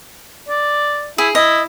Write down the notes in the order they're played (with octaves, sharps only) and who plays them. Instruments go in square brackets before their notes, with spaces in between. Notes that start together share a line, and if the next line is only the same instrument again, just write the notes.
[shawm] D5
[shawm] E4 [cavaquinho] G#4
[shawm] E4 [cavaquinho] D#5